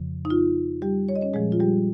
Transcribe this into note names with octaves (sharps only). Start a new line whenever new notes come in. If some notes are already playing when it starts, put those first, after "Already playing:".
Already playing: F2 C#3 F3
D#4
F4
G3 G4
C#5
D#5
C#4 C#5
A#2 F3 G#3 G#4
F4
G3 G4